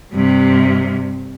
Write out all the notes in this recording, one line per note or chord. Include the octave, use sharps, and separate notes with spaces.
G2 C3